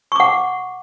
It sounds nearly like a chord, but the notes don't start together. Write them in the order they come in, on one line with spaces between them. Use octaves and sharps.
C#6 D6 F#5